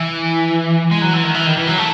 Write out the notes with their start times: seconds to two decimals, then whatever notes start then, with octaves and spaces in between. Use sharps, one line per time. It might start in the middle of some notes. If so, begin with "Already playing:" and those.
Already playing: E3
0.91 G#3
1.02 F#3
1.13 E3
1.23 D#3
1.34 E3
1.46 D#3
1.57 E3
1.67 F#3
1.78 A3